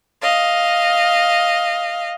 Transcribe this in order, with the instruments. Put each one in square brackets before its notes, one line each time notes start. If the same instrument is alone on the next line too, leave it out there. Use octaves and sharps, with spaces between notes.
[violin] D#5 F5